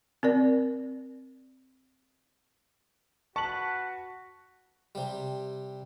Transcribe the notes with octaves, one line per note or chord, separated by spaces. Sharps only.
C4 A#4 D5
F#4 B4 A5 C#6 F#7
C3 G3